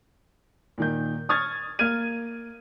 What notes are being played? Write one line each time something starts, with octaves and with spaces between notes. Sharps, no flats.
A#2 D#3 G6
C#6 D#6 F6 G#6 A6
A#3 F6 G#6 D#7